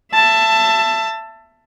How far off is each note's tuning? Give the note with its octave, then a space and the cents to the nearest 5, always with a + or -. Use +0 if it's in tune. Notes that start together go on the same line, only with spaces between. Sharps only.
E5 +20 A5 +10